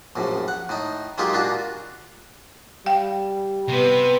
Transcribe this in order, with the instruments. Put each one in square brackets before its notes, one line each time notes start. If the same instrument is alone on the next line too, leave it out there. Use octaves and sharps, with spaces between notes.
[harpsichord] A#1 F#2 A2
F#5
A2 D#4
F#3 G#3 A#3 D#4 F4 G4
A#2 A#3 D4 F4 F#4
[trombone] G3 [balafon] F5 G5
[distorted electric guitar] C3 [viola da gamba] B3 B4